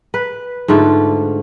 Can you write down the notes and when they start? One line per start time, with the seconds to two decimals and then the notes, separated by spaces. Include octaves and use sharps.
0.14 B4
0.68 G#2 D3 A3 F4